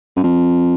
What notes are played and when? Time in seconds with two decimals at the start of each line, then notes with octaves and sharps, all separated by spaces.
0.16 F#2
0.24 F2